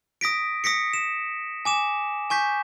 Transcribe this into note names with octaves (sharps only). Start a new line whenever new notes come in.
D#6 A#6 B6 D7
D#6 A#6 B6 C#7
E7
G#5 D6 E7
G#5 C#6 G6 B6